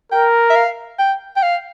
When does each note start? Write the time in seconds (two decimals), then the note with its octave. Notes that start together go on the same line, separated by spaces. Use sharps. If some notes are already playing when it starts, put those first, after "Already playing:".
0.12 A#4 G5
0.50 E5
0.56 F5
0.99 G5
1.37 G5
1.43 F5